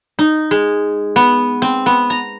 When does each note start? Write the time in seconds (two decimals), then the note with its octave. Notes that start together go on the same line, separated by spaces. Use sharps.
0.19 D#4
0.51 G#3
1.16 B3
1.62 C4
1.86 B3
2.10 A#5